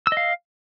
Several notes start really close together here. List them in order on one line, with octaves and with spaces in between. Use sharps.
E6 D#5 F5